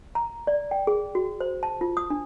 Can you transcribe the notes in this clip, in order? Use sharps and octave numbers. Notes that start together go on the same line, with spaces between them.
A#5
D5
G5
G#4
F#4
C5
A5
F4
D#6
D4